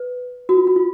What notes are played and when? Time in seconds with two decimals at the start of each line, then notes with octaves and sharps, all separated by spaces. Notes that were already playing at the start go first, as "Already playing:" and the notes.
Already playing: B4
0.49 F#4
0.57 F4
0.67 F#4
0.76 F4